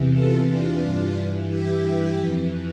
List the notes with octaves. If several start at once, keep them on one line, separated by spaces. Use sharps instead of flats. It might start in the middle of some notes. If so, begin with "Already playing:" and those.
Already playing: E2 C3 E3
F4 A4
D4 F4
G2 E3
E4 G4
F2 E3